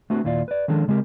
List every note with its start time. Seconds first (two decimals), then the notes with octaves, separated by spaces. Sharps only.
0.10 A3 B3 C4 D4 F#4
0.24 D#2 A#2 E4 F4 D5
0.48 B4 D5
0.68 D#3 F3 G#3 C#4 D4 A4
0.88 C#3 G#3 C4 G4 A#4